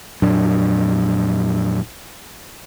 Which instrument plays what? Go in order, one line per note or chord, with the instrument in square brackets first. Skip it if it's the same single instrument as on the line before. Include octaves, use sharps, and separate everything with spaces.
[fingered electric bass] F2 A#2 F#3 D4